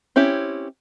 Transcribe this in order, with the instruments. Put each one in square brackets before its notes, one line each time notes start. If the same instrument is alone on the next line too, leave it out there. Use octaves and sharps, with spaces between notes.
[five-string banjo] C4 C#4 E4 G4